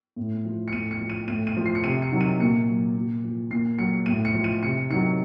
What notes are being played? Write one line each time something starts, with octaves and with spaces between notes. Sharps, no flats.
A2
F3
C#7
A2 D#7
C#7
F3
D#7
A2 D#7
D#7
F3
C7
C#7
C3 D#7
C#7
D#3 F#3
D#7
A#2 C#7
F#3
A#2
F3
A#2 C7
F#3 C#7
A2 D#7
C#7
F3
D#7
C3 C#7
D#3 F#3 C#7